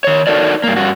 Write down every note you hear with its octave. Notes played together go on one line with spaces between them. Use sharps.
D#3 C#5
D#4 F#4 A4 A#4 D5
G2 A#3
G2 F#4